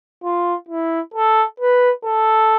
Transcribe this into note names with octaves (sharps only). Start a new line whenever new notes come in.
F4
E4
A4
B4
A4